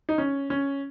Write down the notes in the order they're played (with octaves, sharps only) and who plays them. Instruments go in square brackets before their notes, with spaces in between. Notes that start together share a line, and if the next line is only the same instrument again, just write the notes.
[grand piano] D#4
C#4
C#4